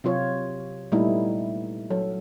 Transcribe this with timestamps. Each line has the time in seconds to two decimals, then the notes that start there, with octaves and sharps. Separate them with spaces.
0.04 C3 F#3 F4 C#5
0.92 A#2 G3 A3 B3 D#4 E4
1.90 F#3 A4